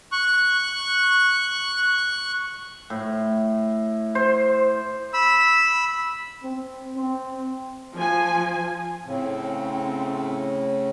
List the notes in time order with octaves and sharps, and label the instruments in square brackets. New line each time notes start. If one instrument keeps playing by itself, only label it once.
[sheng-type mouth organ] C#6 F#6
[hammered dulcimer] A2
C5
[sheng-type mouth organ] B5 E6
[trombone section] C4
C4
[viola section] F3 G#5
[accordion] A2 C#3 [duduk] C4